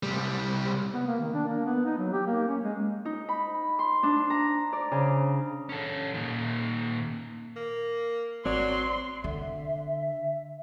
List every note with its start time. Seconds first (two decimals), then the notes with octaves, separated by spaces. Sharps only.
0.03 C2 G3
0.94 B3
1.07 A#3
1.20 D#3
1.34 D4
1.48 A#3
1.65 B3
1.85 D#4
1.98 F#3
2.13 G4
2.27 A#3
2.48 C#4
2.64 G#3
3.05 D#4
3.29 B5
3.79 C6
4.03 D4
4.30 A#5
4.73 D5
4.92 C#3
5.69 C#4 A4
6.14 A#2 D#3
7.56 A#3
8.45 G#1 F#3 C4 D5 C6
9.24 D3 E5